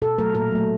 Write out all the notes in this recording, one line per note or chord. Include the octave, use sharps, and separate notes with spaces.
B2 A4
F#3 A3 A#4
A#2 A#4
F#3 A3